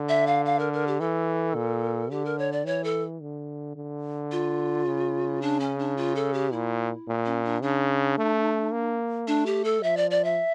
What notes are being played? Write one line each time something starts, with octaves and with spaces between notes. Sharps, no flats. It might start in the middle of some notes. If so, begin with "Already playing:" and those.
Already playing: D3
E5
F5
F5
A#4
A#4
G4
E3 A4
A#2
D3 G4
A#4
C#5
D5
E3 C#5
A4
D3
D3
F4
C#3
D4
C#4
D4
F4
A4
G4
A#2 E4
A#2
C#4
D4
C#3 D4
A3
A#3
A3 D4
G4
A4
F3 E5
D5
D5
E5